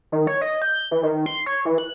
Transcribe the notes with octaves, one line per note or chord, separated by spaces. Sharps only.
D#3
C#5
D#5
G6
E3
D#3
C6
C#5
E3
F#6